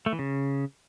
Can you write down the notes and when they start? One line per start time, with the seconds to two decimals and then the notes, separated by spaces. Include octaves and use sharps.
0.06 A3
0.13 E3
0.19 C#3